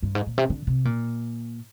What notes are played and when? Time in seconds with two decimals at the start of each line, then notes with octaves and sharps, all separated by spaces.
0.03 G2
0.15 G#2
0.27 A#2
0.38 C3
0.50 D3
0.67 C3
0.85 A#2